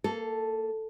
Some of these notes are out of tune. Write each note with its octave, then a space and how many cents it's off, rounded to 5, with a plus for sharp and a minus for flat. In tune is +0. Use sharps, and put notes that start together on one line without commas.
A#3 -25 A4 +0